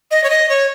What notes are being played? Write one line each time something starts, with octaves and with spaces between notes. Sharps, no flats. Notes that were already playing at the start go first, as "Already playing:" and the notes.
D#5
C#5
D#5
C#5